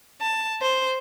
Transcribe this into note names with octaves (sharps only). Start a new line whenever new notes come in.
A5
C5